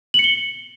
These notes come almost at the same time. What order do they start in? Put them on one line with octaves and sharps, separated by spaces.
F#7 C#7 G7